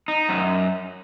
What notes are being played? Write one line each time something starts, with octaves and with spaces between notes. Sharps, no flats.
D#4
F#2